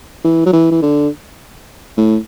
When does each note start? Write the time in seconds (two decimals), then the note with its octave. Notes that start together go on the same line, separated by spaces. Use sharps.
0.24 E3
0.46 F#3
0.53 E3
0.71 E3
0.82 D3
1.97 A2